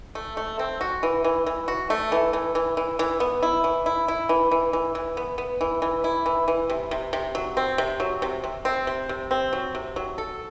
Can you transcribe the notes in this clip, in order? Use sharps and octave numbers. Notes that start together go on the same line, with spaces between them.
A3
A3
C4
F#4
E3
E3
E3
F#4
A3
E3
E3
E3
E3
E3
B3
E4
E3
E4
E4
E3
E3
E3
E3
B3
B3
E3
E3
E4
E3
E3
C3
C3
C3
F#3
C4
C3
F#3
C3
C3
C4
C3
C3
C4
F#3
C3
F#3
A4